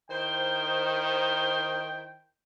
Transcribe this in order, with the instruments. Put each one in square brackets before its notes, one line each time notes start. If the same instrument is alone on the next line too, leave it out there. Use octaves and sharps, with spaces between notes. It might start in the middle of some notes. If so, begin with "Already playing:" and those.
[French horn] D#3 [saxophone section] E4 C5 [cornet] G5